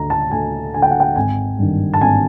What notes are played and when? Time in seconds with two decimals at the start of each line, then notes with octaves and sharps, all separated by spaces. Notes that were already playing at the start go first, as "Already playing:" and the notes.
Already playing: D2 D3 A#5
0.10 A5
0.31 D2 G#5
0.74 D3 G#5
0.82 G5
0.91 F#5
1.00 G5
1.16 G#1 G#5
1.59 G2 D#3
1.94 A5
2.01 G#1 G#5